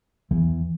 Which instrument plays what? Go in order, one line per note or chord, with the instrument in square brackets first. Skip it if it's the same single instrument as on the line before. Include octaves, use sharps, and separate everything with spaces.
[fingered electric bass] E2 E3